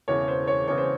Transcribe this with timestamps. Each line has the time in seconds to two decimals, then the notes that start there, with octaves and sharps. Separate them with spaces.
0.08 E1 E2 C#3 E3 C#5
0.28 C5
0.47 C#5
0.67 E1 E2 C#3 E3 C#5
0.78 C5